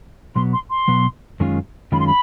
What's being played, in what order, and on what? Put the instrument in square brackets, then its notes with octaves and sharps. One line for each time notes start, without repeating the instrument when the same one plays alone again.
[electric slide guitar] B2 F#3 B3 [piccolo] C6
[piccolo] C6
C6
[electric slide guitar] B2 F#3 B3
F#2 D#3 G#3 C#4 F4
[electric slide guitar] F#2 D#3 G#3 C#4 F4 [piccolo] B5
[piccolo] C6
B5